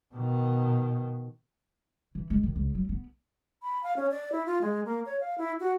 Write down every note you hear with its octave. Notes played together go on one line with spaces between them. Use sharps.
B2 D#3
E3
G#3
D#3
C#2
F#3
B3
B5
F5
C#4
D5
E4
F4
G#3
A#3
C#5
F5
E4
F#4